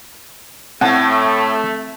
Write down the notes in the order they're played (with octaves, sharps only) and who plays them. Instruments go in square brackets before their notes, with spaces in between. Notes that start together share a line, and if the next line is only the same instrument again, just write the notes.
[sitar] A2 [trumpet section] A3 [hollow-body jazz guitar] C4 G#5 A5 [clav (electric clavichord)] F#5